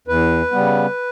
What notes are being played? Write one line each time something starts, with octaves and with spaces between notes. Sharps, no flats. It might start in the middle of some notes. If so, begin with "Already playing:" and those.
E2 B4
C#3 G3 B3